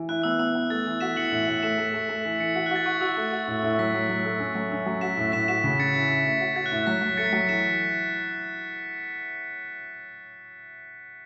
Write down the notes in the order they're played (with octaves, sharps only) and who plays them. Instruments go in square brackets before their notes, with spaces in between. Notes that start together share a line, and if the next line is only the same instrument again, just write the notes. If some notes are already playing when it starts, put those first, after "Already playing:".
Already playing: [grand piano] E3
[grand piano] E4 [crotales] F#6
[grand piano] B3 [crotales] E6
[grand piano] B3 [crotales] E6
[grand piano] B3
[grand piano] A3 [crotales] A6
[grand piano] E3
[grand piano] F#4 [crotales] B6 E7
[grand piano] E3 [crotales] C#7 F#7
[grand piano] A2
A2
[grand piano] A3 [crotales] B6 E7
[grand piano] A3
A3
A3
[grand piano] E3 [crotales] B6
[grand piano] E3 [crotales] A6 C#7
[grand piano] F#4 [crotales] B6
[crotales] F#6
[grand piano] F#4 [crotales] A6
[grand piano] F#4 [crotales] C#6
[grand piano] F#4 [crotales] E6
[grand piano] A3
F#4
A2
A2
[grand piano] F#3 [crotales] B6
[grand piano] F#3
F#3
A3
C#4
F#3
C#4
F#3
[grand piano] F#4 [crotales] B6 E7
[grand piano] A2
[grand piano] A2 [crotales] B6 E7
[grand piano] F#4 [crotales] B6 E7
[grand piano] C#3
[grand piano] C#4 [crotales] A6 C#7
[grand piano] E4 [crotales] B6
[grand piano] E4
A2
F#4
[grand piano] F#4 [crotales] A6
[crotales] F#6
[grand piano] A2
[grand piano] F#3 [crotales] B6
[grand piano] F#3
[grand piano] A3 [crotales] A6 C#7
[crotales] B6
[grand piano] F#3 [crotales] A6 C#7
[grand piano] E3 [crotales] B6 E7